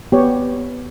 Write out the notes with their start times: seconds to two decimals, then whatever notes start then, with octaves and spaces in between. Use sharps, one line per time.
0.12 B3 G4 C#5